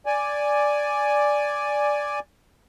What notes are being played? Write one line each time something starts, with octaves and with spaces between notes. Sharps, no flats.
D5 G#5